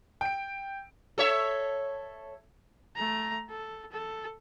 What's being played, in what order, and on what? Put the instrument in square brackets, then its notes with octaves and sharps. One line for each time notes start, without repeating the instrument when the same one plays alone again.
[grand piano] G5 D7
[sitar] A4 C#5 E5
[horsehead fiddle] A3 A#5
A4
A4